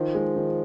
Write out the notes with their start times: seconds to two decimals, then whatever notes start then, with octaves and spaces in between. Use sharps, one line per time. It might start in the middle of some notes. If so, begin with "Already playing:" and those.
Already playing: D#3 F3
0.15 G#3
0.36 D#3